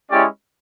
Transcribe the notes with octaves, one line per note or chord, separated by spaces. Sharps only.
G#3 C#4 E4 G4 D5